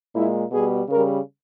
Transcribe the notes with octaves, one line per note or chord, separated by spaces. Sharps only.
A#2 G#3 E4
B2 G3 G#4
C#3 G3 A#4